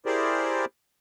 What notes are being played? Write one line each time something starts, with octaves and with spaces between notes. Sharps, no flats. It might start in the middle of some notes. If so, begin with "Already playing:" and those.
E4 G4 G#4 A#4 C5 D5